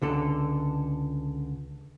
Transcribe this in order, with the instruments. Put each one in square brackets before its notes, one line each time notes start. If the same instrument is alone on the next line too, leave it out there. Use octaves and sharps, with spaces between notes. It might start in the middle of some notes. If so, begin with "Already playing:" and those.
[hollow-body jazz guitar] C#2 D3 A4